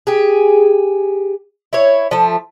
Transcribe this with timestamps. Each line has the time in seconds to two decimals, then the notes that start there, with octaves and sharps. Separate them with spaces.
0.07 G4 G#4
1.73 E4 C#5
2.11 F3 A3